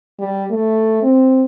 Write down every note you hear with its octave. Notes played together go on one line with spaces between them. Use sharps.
G3
A3
C4